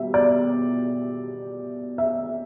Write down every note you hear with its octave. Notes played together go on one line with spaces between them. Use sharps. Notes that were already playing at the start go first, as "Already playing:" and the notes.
Already playing: B2 G3 B3 E5
D5
E5